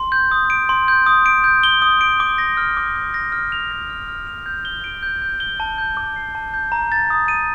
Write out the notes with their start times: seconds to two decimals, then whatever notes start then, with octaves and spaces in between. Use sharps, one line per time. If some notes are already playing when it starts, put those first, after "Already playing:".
Already playing: C6
0.12 G6
0.31 D#6
0.50 D7
0.69 C6
0.88 G6
1.06 D#6
1.26 D7
1.44 G6
1.63 G7
1.82 D#6
2.01 D7
2.20 D6
2.38 A#6
2.57 F6
2.77 D6
2.96 D6
3.14 A#6
3.32 F6
3.52 F7
3.71 A#6
3.90 F6
4.08 F6
4.27 F7
4.46 G6
4.65 G7
4.84 D7
5.03 G6
5.22 G6
5.40 G7
5.60 A5
5.78 G6
5.97 D6
6.16 C7
6.35 A5
6.54 G6
6.72 A#5
6.92 A6
7.10 D#6
7.28 D#7